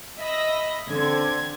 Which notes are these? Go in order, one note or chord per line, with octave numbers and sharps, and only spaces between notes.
D#5 E5 B5 A#6
D3 C4 G#6